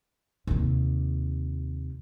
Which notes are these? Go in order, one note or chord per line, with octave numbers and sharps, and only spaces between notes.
D#2 C3